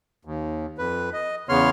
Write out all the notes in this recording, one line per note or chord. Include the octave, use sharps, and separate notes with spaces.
D#2
F2 B4
D#5
E2 C#3 B3 C#5 C6 F6